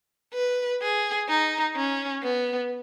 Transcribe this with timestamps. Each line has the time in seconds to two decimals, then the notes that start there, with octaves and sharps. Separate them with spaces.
0.34 B4
0.82 G#4
1.28 D#4
1.76 C#4
2.23 B3